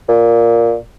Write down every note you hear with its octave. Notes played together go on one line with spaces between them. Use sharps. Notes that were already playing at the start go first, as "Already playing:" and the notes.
A#2